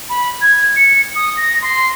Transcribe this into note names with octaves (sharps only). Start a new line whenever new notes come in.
B5
G#6
C#7
D#6
A#6
C6